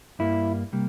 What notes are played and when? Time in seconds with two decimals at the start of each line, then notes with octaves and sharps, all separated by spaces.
0.19 G2 G3 A#3 E4
0.73 C3 G3 A#3